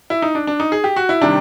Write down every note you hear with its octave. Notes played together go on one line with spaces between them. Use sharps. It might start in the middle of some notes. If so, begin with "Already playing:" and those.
E4
D#4
D4
D4
D#4
G#4
G4
F#4
E4
C3 D#3 G3 D4